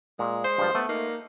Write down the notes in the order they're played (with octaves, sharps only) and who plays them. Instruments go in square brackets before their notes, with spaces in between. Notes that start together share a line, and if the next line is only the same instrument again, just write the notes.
[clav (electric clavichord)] A#2 [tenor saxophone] G#3
[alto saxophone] C5
[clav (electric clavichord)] G2 F3
[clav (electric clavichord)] A3 [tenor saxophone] B3
[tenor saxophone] A#3 [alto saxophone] D#4